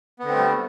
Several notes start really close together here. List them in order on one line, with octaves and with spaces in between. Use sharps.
B3 D3 C4 A3 G3